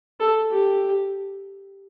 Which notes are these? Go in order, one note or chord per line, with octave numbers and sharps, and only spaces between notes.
A4
G4